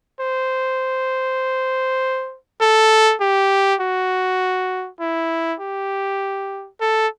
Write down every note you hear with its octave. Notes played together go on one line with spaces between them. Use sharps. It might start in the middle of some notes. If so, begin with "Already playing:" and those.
C5
A4
G4
F#4
E4
G4
A4